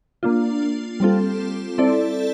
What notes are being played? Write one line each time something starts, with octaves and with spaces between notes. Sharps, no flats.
A#3 D4 F4
G3 C4 F4 A4
C4 E4 A4 D5